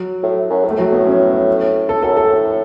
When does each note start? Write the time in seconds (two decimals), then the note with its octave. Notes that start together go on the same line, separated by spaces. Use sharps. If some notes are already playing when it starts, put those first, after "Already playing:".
Already playing: F#3
0.23 A2
0.50 F#2
0.64 A2
0.71 A3
0.78 A2 F#3
0.92 A2 B3
1.07 C#4
1.89 A4
2.03 F#2 A4
2.17 A2 A4